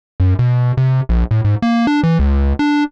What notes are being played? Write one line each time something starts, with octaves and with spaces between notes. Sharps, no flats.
F#2
B2
C3
A#1
A2
G#2
A#3
D4
E3
C#2
D4